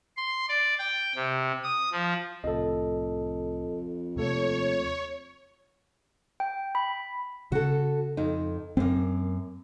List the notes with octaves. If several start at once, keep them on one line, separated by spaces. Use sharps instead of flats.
C6
D5
G5
C3
D#6
F3
C2 F2 A2 A4 D#5
D#2 C3 A3 A#3 A4 C#5
G5
B5
C#3 F#4 A4
F2 D#4
F#2 A#3 C4